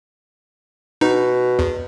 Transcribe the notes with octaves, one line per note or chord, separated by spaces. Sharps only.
B2 D#4
E2